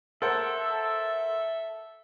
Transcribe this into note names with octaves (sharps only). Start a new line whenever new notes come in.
A4 A#4 C5 E5 F#5